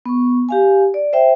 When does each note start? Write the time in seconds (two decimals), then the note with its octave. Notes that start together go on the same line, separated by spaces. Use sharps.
0.06 B3 C#6
0.49 G4 F5 G#5
0.94 D5
1.13 C5 E5 G5